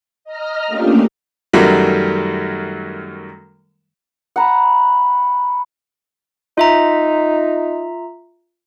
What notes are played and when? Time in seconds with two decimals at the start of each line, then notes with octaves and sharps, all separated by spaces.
0.24 D#5 A#5 F6
0.67 A3 A#3 C#4 D4 F4 G4
1.53 F#2 D#3 F#3 G3 A3
4.36 F#5 A#5 B5
6.58 D#4 F4 E5 A#5